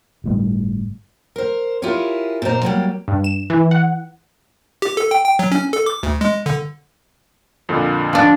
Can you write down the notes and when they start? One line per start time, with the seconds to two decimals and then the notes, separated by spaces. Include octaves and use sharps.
0.24 G1 A2 G3
1.36 A#4 C5
1.82 E4 F4 G4 G#4 A#4 C#5
2.42 A#2 A#3 C4 D#4 C5 A#5
2.63 F#3 G3 A#3
3.08 G2
3.24 E7
3.50 E3
3.71 F#5
4.82 G4
4.97 A4
5.11 G5
5.24 G5
5.39 F#3
5.52 C#4
5.73 A4
5.86 D6
6.03 D2
6.21 G#3
6.46 D3
7.69 F2 A#2 D3
8.13 F3 D4